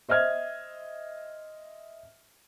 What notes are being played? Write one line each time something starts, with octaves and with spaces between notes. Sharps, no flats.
C5 D#5 E5 F6 G#6